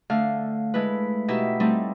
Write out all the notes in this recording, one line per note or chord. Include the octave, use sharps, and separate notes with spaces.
D3 A3 F5
G#3 A3 E4 B4
B2 D#4 E4 G4 E5
G3 A3 C4 D#4 E4